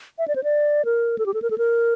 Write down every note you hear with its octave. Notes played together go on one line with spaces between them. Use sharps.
E5
D5
C5
D5
A#4
A4
G4
A4
A#4
A4
A#4